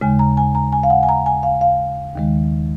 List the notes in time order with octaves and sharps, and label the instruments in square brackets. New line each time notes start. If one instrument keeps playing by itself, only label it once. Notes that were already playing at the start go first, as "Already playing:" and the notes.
[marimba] D#2 C#3 G#3 G#5
A#5
G#5
A#5
G#5
F5
F#5
G#5
A#5
G#5
F5
F5
D#2 D#3 G#3